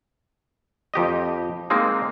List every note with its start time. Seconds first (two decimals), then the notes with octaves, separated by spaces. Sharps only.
0.94 F2 G4 D#5
1.70 G#3 A#3 C4 D#4